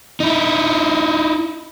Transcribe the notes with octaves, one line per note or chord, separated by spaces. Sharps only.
D#4 E4